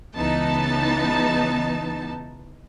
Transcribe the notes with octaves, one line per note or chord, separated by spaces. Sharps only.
C#2 E3 B3 D#4 A5